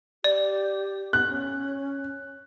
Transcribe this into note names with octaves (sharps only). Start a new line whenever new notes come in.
G4 D5
B3 F#6
C#4